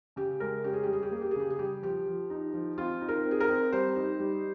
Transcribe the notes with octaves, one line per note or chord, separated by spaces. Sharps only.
C#3 G4
G#3 A#4
C#4 G4
G#4
G3 G4
G#4
G4
A#3 G#4
G4
G#4
C#3 G4
G#4
G3 G4
F3 G4
F3
D#4
F3
C4 F4
D#4
A#4
C4
G#4
A#4
C4
G3 C5
D#4
G3